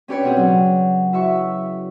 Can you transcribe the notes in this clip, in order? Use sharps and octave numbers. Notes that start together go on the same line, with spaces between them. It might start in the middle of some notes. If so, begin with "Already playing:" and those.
C#4 D4 G4 B4 C#5 D5
B2 C4 G#4
C#3 F#3
E4 F#4 E5 C#6